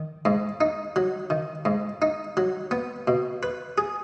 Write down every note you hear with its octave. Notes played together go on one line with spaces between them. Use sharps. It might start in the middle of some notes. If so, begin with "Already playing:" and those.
Already playing: D#3
G#2
D#4
F#3
D#3
G#2
D#4
F#3
B3
B2
B4
G#4